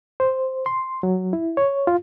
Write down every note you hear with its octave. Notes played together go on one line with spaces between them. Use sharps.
C5
C6
F#3
E4
C#5
F4